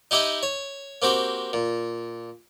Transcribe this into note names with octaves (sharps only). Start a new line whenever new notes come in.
D#4 E4 G4 D#5 E5
C#5
A#3 C4 F#4 G4
A#2